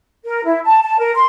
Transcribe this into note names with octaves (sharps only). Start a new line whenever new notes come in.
A#4
E4
A5
A5
A#4
C6